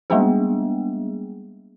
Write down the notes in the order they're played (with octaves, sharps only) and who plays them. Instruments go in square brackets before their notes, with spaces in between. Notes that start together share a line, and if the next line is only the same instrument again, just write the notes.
[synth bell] G3 G#3 A#3 B3 D4 G#4